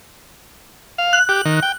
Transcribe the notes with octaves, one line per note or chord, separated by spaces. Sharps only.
F5
F#6
G4
D#3
G5